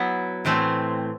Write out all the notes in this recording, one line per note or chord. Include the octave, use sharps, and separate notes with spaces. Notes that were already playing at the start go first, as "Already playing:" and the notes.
Already playing: F#3 B3 E4
A2 E3 A3 C4